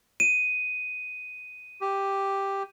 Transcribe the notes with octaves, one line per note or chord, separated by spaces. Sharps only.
D#7
G4